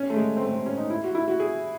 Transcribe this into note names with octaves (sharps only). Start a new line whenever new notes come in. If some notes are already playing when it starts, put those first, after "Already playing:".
Already playing: C#4
A3
G#3
C4
A3
C4
C#4
D#4
E4
F#4
E4
F#4
G#4